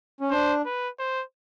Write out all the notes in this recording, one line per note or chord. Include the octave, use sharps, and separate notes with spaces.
C#4
D4 C5
B4
C5